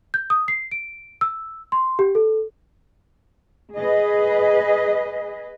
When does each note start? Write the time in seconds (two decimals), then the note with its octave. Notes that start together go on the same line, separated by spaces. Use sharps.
0.14 G6
0.30 D#6
0.48 C7
0.71 D7
1.21 E6
1.72 C6
1.99 G4
2.15 A4
3.78 G#4 B4 D#5